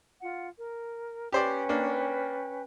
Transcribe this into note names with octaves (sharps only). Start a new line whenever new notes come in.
F4 F#5
A#4
C#4 G4 B4 C5 D5 G5
A#3 D4